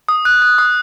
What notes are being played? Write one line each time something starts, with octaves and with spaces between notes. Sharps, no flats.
D#6
F#6
F#6
D#6